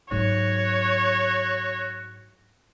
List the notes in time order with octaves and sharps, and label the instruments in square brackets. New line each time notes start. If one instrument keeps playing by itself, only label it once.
[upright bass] G#2 F#3 [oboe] F#4 [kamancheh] C#5